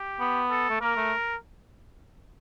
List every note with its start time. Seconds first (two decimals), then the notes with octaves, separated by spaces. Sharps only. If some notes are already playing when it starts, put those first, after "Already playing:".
Already playing: G4
0.20 B3
0.50 A4
0.70 A3
0.81 A#3 A#4
0.96 A3